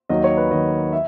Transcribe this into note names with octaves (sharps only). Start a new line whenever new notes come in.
D#2 D#3 F#3 D#5
C#5
B4
D#2 D#3 F#3 D#5
E5